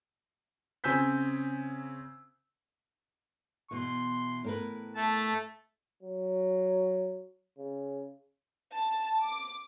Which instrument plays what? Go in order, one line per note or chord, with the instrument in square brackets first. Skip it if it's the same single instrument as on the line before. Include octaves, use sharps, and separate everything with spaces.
[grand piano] C#3 C4 G#5 E6 G6 B6
[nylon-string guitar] B2 E3 [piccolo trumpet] C6
[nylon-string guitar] A2 A#4 B4
[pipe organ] A3 [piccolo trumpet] A5
[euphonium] F#3
C#3
[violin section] A5
D6